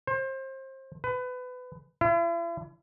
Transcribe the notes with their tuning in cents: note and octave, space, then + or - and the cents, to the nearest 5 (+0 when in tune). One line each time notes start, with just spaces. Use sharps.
C5 +30
B4 +25
E4 +45